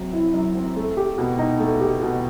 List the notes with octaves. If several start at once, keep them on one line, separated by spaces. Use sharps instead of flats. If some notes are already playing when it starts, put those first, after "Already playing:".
Already playing: F#2 F#3 C4
E4
F#2
C4
A3
G4
B2
D#4
A3
G4
B2